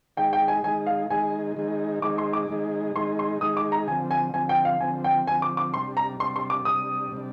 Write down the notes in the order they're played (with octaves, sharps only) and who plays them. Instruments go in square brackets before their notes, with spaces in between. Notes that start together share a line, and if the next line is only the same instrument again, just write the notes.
[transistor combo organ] D#3 G#3 D#4 G#4 [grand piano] G5
[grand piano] G5
G#5
[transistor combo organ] D#3 G#3 D#4 G#4 [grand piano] G#5
[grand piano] F5
[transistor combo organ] D#3 G#3 D#4 G#4 [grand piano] G#5
[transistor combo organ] D#3 G#3 D#4 G#4
[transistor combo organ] D#3 G#3 D#4 G#4 [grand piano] D6
[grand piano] C6
D6
[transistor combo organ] D#3 G#3 D#4 G#4
[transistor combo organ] D#3 G#3 D#4 G#4 [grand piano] C6
[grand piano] C6
[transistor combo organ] D#3 G#3 D#4 G#4 [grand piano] D#6
[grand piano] D6
A#5
[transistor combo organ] D3 F3 C4 [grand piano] G#5
[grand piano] G#5
[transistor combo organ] D3 F3 C4 [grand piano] G#5
[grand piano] G5
F5
[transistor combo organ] D3 F3 C4 [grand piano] G#5
[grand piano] G5
[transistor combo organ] D3 F3 C4 [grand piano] G#5
[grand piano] D6
D6
[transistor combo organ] C3 G3 D4 [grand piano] C6
[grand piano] A#5
[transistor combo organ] C3 G3 D4 [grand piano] C6
[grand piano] C6
D6
[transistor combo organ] C3 G3 D4 [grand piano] D#6
[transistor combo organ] C3 G3 D4